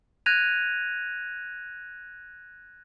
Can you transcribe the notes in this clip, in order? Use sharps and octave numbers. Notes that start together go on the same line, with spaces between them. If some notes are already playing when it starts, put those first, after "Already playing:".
F#6 G#6 A#6 D#7 F7